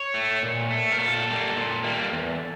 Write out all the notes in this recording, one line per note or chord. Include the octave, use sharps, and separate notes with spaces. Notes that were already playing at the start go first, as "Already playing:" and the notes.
Already playing: C#5
A3
A#2
A3
A#4
A#2 A4
G3 A#3
A#2
G3 A#3
E2